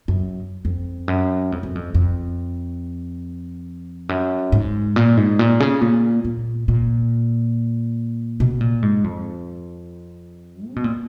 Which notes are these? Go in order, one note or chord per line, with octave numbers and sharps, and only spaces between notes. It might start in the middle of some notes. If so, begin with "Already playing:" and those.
F#2
F2
F#2
F2
F#2
F2
F2
F#2
G#2
A#2
G#2
A#2
C#3
A#2
A#2
A#2
B2
A#2
G#2
F2
C#3
B2
A#2